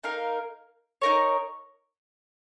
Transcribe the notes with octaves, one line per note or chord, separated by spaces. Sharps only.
A#3 D#4 A#4 F5
D#4 A#4 C#5